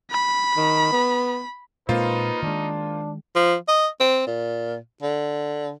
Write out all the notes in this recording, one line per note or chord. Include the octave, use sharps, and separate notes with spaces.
B5
D#3
B3
A#2 G#3 A#3 C4 D#4 F4 B4 C5
D#3 G#3 D4
F3
D#5
C4
A#2
D3